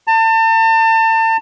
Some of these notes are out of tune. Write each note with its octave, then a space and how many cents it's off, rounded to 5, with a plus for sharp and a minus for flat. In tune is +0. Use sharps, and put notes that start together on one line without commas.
A5 +35